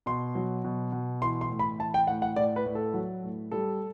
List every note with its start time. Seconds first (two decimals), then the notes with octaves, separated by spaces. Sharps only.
0.06 B2 C6
0.35 F#3
0.64 B2
0.92 B2
1.21 E3 C6
1.41 C6
1.50 A2
1.59 B5
1.79 E3 A5
1.94 G5
2.07 A2 F#5
2.22 F#5
2.36 A2 D5
2.56 B4
2.66 A2
2.75 A4
2.94 F#3
3.23 A2
3.52 G3 A4